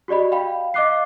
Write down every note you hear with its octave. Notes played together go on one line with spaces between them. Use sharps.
F#4 G4 D5 D#5 B5
F5 G5 B5
D#5 F5 D6 F#6 C7